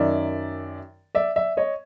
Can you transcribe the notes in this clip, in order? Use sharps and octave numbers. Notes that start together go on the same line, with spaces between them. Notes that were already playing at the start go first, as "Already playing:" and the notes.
Already playing: F#2 D#3 D5 E5
D5 E5
D5 E5
C#5 D#5